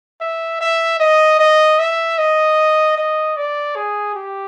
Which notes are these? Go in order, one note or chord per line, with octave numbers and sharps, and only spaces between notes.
E5
E5
D#5
D#5
E5
D#5
D#5
D5
G#4
G4